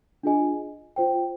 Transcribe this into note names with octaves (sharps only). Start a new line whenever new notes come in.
D4 F4 G#4 D#5 G#5
F4 C5 G5